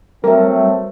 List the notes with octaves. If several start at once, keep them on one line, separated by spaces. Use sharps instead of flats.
F#3 G3 A3 C4 A#4 E5